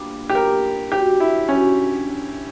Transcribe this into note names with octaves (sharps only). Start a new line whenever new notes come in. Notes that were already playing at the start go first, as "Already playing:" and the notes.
Already playing: A#2 G3 B3 D4
G4
A#2 G3 B3 A#4
F#2 D3 F#3 G4
E4
F#2 D3 F#3 C#4